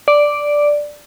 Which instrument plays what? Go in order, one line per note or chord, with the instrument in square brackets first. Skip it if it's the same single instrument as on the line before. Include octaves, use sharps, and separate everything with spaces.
[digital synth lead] D5